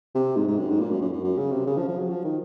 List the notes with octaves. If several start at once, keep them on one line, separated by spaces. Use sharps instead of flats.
C3
G#2
G#2
F#2
G#2
A#2
F#2
F#2
F#2
F#2
C#3
C3
C#3
F3
F3
F#3
F3
D#3